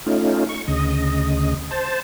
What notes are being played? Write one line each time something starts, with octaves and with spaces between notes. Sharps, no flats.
A3 C#4 D#4 F4
C#6
D2 C#3 D#5
C5 A5